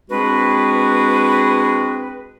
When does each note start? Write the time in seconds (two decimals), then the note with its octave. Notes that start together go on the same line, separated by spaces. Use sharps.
0.10 G#3 C4 D4 F#4 G#4 B4